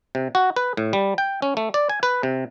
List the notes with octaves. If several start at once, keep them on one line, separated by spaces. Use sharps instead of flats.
C3
F#4
B4
A2
G3
G5
C#4
A3
D5
G#5
B4
C3